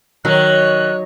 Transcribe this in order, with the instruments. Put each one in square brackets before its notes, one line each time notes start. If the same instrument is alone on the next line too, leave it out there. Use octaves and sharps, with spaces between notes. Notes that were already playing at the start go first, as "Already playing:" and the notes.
[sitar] D#3 [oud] F#3 [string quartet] C#5 [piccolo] F#6